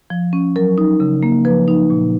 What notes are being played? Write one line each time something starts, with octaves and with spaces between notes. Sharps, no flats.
F3
C#4
F#3 A#4
D#4
C#3
A#3
F3 B4
D#4
A#2